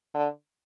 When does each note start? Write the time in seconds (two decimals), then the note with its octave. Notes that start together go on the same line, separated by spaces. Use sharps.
0.14 D3